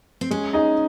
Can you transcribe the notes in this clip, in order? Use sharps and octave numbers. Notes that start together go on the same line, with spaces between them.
C4
G#3 C#4
D#4 G#4 D#5